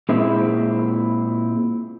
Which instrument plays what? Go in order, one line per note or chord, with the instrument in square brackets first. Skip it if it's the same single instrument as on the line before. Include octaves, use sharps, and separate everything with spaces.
[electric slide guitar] A#2 G#3 C4 E4